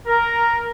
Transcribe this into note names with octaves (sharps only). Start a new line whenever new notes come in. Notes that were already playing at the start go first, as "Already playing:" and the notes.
A#4